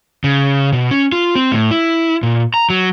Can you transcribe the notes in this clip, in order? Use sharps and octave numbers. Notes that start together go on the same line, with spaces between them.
C#3
B2
C#4
F4
C4
A2
E4
A#2
A#5
F#3